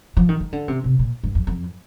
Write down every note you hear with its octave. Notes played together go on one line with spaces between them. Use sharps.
F3
D#3
D#3
D3
C3
C3
A#2
G2
F2
F2